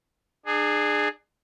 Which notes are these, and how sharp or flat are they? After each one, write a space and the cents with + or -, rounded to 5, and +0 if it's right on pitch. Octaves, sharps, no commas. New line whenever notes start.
D4 +35 G#4 +0